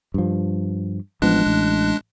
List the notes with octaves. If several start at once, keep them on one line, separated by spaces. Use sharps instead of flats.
G2 F3
A1 F3 G#3 B3 D4 F#6
A1